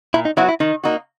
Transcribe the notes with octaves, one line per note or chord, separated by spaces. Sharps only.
A#2 E4
D#4
F#3 B3 E4 F#4
E4
D#3 D#4
A#3 D#4 F#4